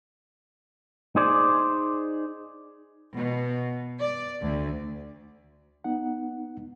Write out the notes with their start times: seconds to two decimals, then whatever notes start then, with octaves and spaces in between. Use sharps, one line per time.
1.16 D#4 G#4 C5 D5
3.17 B2
4.01 D5
4.42 D2
5.84 B3 D#4 F#5